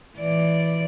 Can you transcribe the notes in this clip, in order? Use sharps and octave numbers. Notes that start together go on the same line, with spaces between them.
E3 D5